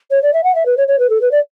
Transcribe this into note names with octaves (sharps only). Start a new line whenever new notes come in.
C#5
D5
E5
F#5
E5
B4
C#5
C#5
B4
A4
B4
D5